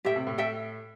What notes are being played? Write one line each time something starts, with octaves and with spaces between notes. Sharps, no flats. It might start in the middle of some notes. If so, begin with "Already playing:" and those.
A2 G4 E5 G5
C3
A2
A4 E5 G5